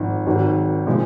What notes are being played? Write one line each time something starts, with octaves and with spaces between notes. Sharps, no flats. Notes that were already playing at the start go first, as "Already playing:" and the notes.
Already playing: G#1 G#2 F3
G#1 G#2 D#3 F#3
A#2 F3 G#3 D#4